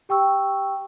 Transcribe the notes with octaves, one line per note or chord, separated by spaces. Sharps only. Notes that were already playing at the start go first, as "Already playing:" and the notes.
G4 G5 C#6 E6